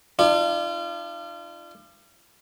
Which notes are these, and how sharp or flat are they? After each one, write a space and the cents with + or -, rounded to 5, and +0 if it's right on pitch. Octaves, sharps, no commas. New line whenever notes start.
D4 +35 F4 -35